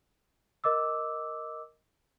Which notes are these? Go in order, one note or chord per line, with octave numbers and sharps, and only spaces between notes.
A#4 D#5 D6 E6